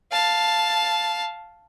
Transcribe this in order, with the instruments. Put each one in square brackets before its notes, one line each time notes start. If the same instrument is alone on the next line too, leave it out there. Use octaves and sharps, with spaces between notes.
[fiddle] F5 A5